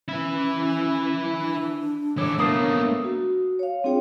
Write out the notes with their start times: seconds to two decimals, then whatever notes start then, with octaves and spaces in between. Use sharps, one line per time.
0.09 E3 C#4 E4
1.38 D4
2.18 E3 A4 C#5 D6
2.38 B2 A3 A#3 D#6 C7
3.04 F#4
3.59 C#5 F5
3.84 C4 D4 F4 G#4 C#5 G5